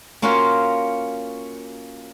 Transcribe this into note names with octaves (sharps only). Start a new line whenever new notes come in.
A#3 C#4 F4 F#4 C#5 F5